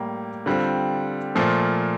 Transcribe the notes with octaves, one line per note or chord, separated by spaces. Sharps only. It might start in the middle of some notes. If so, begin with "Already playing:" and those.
Already playing: A2 G3 A#3
D3 G3 C4 F4
A#2 F3 A3